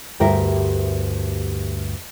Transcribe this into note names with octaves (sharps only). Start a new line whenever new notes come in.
D2 G2 G4 A#4 E5